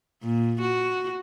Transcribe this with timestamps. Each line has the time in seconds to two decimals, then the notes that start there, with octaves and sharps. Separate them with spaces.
0.22 A#2
0.60 F#4